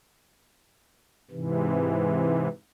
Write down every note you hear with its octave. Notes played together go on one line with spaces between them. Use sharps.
G#2 C3 E3